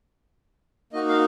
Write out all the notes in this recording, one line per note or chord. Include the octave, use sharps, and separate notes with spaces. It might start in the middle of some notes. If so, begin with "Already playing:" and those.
A#3 D#4 F#4 D#5
F5